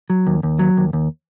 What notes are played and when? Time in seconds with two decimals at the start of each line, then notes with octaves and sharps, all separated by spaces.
0.10 F#3
0.27 D#2
0.43 D#2
0.59 F#3
0.77 D#2
0.93 D#2